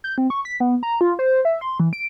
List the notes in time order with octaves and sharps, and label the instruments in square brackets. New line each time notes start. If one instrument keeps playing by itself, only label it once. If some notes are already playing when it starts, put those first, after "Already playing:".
[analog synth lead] G6
C4
C#6
B6
B3
A#5
F4
C5
E5
C6
E3
D7